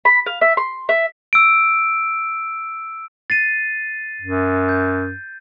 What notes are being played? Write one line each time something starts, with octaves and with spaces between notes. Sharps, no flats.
B5
F5
E5
C6
E5
E6 D7
A6 C7 D#7
F#2
G6